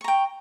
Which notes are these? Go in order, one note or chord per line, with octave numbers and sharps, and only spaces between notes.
G5 A#5 C#6